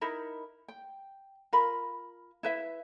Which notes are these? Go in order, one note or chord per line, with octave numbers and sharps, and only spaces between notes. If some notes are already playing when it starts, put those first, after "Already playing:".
D#4 E4 A#4 B5
G5
F4 A#4 B5
E4 B4 E5